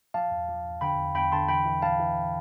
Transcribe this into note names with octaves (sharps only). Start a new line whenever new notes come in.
F3 F5 A5
E2
F3
E2
D3 G5 B5
E2
E2 G5 B5
D3 A5 C6
E3 G5 B5
E3
E3 F5 A5
E3